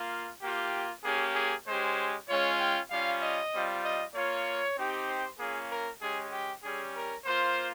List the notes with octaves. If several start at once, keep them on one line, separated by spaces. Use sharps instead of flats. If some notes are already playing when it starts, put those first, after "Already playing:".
Already playing: A#3 F4
A#3 F4 G4
A#3 C#4 G4 G#4
G#4
G#3 C#4 G4 C5
G#3 C#4 F4 C#5
G5
G3 C#4 F4 F5
D#5
G3 C4 F4
D#5
A#3 F4 C#5
C4 D#4 G4
C5
A#3 C#4 F4 G#4
A#4
G#3 C#4 G4 G#4
G4
G3 C#4 G4 G#4
A#4
A#3 F4 C5